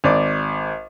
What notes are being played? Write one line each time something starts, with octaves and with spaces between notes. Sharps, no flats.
G#1 D5